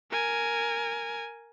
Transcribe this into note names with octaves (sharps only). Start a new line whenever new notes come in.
A#4 G#5